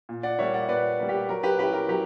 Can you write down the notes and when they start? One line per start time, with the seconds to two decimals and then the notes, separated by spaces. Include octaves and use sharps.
0.09 A#2
0.23 D5 F#5
0.39 G3 A#3 C#5 E5
0.54 D5 F#5
0.68 A#2 B4 D5
0.99 G3 A#3
1.09 G4
1.29 F#3 A#4
1.43 G4 B4
1.59 C#4 E4 G4 B4
1.73 A#4
1.89 F#3 G4